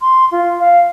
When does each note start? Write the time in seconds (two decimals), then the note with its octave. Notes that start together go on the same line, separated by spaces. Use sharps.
0.01 C6
0.32 F4
0.60 F5